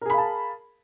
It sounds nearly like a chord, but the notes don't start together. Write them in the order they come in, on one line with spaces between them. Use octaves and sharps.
A#4 G#4 B5 F5 A5